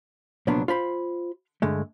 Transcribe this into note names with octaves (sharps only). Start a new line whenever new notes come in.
C2 A#2 F3 F#3 B3 D4
F4 C5 B5
G2 D3 G#3 A3